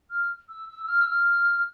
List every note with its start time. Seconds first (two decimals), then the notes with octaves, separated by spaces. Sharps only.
0.10 F6
0.49 E6
0.69 E6
0.84 E6
0.88 F6
1.01 E6
1.07 F6